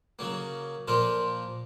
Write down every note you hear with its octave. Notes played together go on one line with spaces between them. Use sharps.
C#3 F#3 A#3
A#2 F3 A#3 F4 A#4